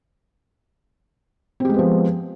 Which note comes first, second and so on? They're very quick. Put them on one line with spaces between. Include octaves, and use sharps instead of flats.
C4 G4 G#3 B3 F3